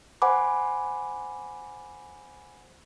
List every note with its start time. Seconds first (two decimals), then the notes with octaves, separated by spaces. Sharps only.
0.22 C5 F#5 G#5 B5 D6